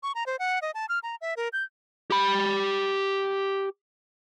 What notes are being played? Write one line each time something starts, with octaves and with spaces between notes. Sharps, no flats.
C#6
A#5
C5
F#5
D#5
A5
F6
A#5
E5
A#4
G6
G4 B5